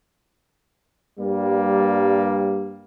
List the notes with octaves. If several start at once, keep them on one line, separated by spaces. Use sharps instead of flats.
G2 G3 A#3